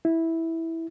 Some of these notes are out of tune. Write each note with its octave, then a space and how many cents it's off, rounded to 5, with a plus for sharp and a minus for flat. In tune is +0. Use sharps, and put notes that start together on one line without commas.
E4 -10